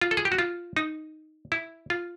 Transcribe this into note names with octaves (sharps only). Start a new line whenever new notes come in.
F4
A4
G#4
G4
F#4
F4
D#4
E4
F4